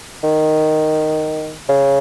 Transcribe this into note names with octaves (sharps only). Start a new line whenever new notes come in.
D#3
C#3